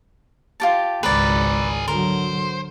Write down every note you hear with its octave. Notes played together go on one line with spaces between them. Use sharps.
F4 G4 A5
G#1 C#2 G#4 A#4 B4 D5
D3 F#3 A#4 C5